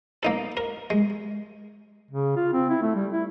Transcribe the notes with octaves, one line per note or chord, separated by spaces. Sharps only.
A#3 D#4 A4
A#4
G#3
C#3
F4
C4
E4
A3
G3
E4